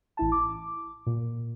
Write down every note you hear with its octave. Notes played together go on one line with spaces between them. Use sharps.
A1 E4 A5
D6
A#2